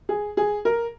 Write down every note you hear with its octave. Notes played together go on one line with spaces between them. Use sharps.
G#4
G#4
A#4